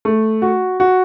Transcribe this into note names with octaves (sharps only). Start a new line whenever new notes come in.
A3
F#4
F#4